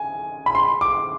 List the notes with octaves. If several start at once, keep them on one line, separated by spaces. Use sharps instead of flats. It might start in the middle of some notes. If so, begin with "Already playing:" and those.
Already playing: G#5
B5
C6
D6